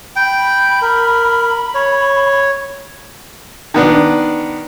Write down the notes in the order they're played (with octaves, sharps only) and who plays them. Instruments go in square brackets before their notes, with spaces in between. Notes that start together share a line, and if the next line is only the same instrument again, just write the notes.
[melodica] G5 [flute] B5
[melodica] A#4
C#5
[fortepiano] D#3 B3 D4